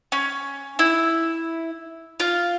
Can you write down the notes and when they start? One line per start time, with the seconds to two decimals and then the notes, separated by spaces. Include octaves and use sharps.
0.12 C#4
0.79 E4
2.20 F4